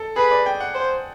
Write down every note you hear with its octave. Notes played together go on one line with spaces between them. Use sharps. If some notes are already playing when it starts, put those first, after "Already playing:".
Already playing: A4
G#4 B4
D5
G5
F#5
C5